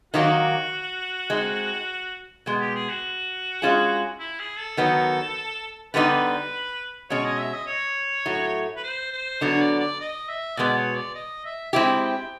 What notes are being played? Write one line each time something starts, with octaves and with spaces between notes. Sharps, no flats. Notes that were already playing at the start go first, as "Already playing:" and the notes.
D#3 F#3 A#3 D#4 F#4 G4
G#3 C4 D#4
B2 G#3 B3
G4
G#4
F#4
G#3 C#4 F4 G#4
E4
G#4
A4
D#3 F#3 B3
D3 G3 B3 D#4 G4 B4
B2 G#3 C#4 C#5
D#5
E5
D#5
C#5
A2 F#3 A3
B4
C5
C5
D3 F#3 B3 D4 C#5
D5
D5
D#5
E5
B2 G#3 B3 D5
C#5
D5
D#5
E5
G#3 C4 E4 G4
G5